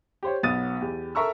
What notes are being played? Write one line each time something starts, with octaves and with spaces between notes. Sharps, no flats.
G4 C5 C#5
B1 F#3 B3 D#6 A6 D#7
E2 G4
A4 A#4 E5 A#5 C#6 E6